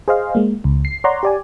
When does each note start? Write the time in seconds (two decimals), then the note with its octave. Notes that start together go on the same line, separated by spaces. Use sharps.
0.08 G#4 C5 D#5 F5
0.35 G#3 A#3
0.64 C#2
0.85 C7
1.04 C#5 D5 F#5 A#5 C6
1.23 G4 D5 G#5